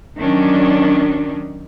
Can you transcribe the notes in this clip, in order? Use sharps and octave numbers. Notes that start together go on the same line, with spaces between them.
D#3 F#3 C#4 D4